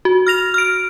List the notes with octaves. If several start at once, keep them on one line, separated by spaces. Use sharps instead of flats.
F#4
F6 A#6 F7
F6 D7